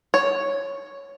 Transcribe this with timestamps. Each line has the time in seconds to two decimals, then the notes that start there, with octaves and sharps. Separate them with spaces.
0.14 C#5